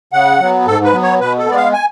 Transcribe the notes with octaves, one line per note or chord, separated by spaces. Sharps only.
C#3 F#5
F#3 B3
G#2 A4
B4
F#3 B3
C#5
B2 B4
A4
G#3 B3 D5
F5
G#5